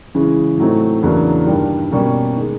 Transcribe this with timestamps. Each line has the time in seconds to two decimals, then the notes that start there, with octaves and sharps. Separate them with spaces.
0.14 C#3 E3 G#3 C#4
0.58 A2 F#3 A3 C4 D#4
1.03 E2 C#3 F#3 A#3 D4
1.47 G2 D#3 G3
1.91 B2 G3 A#3 C#4
2.37 D#3 G#3